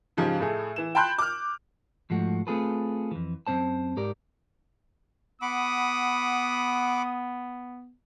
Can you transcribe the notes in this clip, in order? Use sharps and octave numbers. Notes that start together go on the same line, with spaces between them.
G#2 C#3 F3 G4
A2 A3 G#4
E3 E7
G5 A5 B5 C6 F#6 G6
D6 F6
G#2 F3 A3 F#4
A3 C4 F4 G#4 A4 B4
F2 E3
F#2 F3 C4 C5 A5
G#2 G4 A#4 D5
B3 F#5 B5 D6 D#6